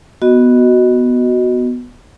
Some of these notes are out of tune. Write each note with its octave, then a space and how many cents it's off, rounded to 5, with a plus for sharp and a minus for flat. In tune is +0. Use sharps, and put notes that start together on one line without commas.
B3 +0 F#4 +0 D#5 +0